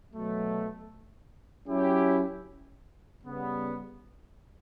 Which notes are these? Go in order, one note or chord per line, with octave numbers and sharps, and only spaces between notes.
B2 F#3 A3
F#3 C#4 E4 G4
C#3 G3 B3